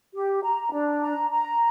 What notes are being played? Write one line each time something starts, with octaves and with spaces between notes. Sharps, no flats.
G4
A#5
D4
A#5
A#5